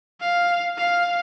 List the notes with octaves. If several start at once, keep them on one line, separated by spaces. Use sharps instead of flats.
F5
F5